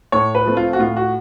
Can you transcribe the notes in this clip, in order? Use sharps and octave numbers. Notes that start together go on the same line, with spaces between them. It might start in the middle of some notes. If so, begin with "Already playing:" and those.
A2 C#5
B4
F3 A3 C4
F4
F#4
A2 F4
F#4